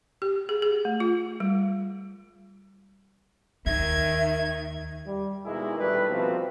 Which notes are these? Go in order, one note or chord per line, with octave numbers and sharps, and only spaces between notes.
G4
G#4
G#4
A3
F4
G3
D#2 D#3 E5 G#6
G3
B2 D#3 G#3 A#3 E4 G#4
A#1 E3 G3 A3 B4
B2 D#3 F3 G3 A#3 C4